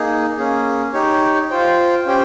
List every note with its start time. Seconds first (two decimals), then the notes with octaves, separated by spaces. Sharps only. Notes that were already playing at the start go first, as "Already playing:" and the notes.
Already playing: A#3 D#4 G#4
0.37 A#3 C#4 G#4
0.93 D#4 G4 C#5
1.50 F4 C5 G5
2.06 C#4 G4 C5 G5